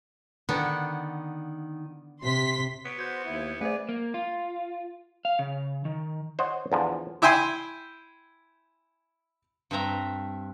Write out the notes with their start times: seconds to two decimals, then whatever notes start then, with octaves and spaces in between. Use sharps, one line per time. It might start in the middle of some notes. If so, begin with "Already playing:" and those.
0.49 D3 D#3 B3 D4
2.22 C3 C6 B6
2.85 B3 C#5 B6 D7
2.99 F#4 C5 G6 G#6
3.26 D#2 E4
3.61 A3 G#4 B4 C5 D5
3.89 A#3
4.14 F4
5.25 F5
5.39 C#3
5.85 D#3
6.39 C5 C#5 D#5 F#5
6.72 E2 D3 F3
7.22 E4 E5 G5 G#5 C6
9.71 G2 A3 C4 E5 A#5